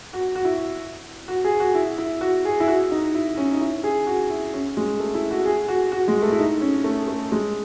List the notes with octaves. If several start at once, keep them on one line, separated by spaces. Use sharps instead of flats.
F#4
F#4
E4
F#4
F#4
G#4
F#4
E4
E4
F#4
G#4
E4
F#4
D#4
E4
C#4
D#4
E4
G#4
F#4
E4
C#4
G#3
A3
E4
F#4
G#4
F#4
F#4
G#3
A3
E4
D#4
C#4
A3
A3
G#3